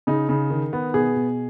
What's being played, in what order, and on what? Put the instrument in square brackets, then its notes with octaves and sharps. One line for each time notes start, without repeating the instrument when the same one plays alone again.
[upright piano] C#3 D#4
C#3
D#3
B3
B2 G#4
B2